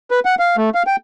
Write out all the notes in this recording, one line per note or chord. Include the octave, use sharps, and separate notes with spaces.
B4
F#5
F5
A3
F5
G5